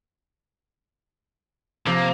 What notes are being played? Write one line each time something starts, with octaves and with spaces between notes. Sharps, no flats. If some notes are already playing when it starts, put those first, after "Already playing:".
C3 F3 A#3